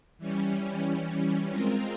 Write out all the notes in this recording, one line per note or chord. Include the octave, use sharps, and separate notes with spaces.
E3 G3 C#4
G#3 C4 F4 A#4